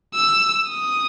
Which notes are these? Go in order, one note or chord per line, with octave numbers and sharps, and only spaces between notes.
E6
D#6